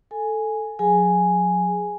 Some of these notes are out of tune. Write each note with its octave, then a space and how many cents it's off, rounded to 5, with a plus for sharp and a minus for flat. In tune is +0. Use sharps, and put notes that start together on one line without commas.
A4 +0 G#5 +0
F#3 -40 G#4 +0 G#5 +0